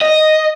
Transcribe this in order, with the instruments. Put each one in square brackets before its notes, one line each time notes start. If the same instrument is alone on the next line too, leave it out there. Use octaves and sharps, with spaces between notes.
[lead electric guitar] D#5